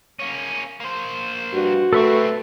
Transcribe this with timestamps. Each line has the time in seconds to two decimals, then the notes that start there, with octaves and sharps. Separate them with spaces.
0.19 A#3 C#4
0.80 A#3 C5
1.54 G2 F#4
1.93 B1 A3 C4 A4 B4 C#6